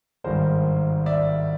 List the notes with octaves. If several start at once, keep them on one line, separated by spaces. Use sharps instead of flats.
G#1 G2 D#3 G#3 A#4 C5
D5 E5